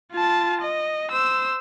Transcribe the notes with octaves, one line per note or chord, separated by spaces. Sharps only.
F4 A5
D#5
C5 E6